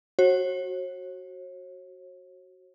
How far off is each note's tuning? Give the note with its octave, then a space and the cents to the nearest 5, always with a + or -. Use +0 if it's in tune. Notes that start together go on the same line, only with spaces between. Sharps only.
F#4 +5 C#5 -45